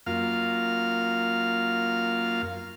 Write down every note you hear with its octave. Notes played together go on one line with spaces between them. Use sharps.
F#2 A#3 F4 F5 F6